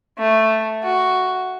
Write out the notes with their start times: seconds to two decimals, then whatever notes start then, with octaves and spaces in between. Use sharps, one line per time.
0.19 A3
0.84 F#4